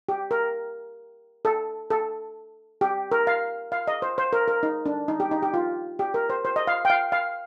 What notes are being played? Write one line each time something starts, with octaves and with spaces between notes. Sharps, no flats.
G4
A#4
A4
A4
G4
A#4
F5
F5
D#5
C5
C5
A#4
A#4
D#4
D4
D#4
G4
D#4
G4
F4
G4
A#4
C5
C5
D#5
F5
G5
F5
F5